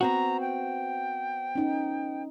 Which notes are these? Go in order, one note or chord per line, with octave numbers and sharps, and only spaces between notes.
B3 C4 F#4 A#5
G5
C#4 D#4